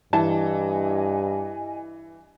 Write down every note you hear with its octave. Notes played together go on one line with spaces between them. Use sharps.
G2 E3 D#5 G#5 A5